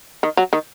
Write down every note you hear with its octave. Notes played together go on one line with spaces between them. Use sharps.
D#3
F#3
D#3